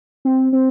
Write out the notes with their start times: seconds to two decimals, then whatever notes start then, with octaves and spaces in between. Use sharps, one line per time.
0.25 C4
0.53 C4